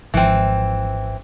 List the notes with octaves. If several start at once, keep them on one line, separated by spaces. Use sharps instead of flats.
G#1 E3 F3 C4